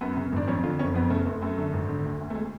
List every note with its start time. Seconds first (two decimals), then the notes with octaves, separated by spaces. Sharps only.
0.01 F#2 B3
0.17 C#3
0.32 G#1 D4
0.47 F2 C#4
0.63 D3 F4
0.79 F#1 C#4
0.94 F2 B3
1.10 C#3 A3
1.26 F1 A3
1.42 F#2 A3
1.58 D3
1.73 G#1
1.89 D3
2.05 D2
2.20 D2
2.30 A3
2.35 G#3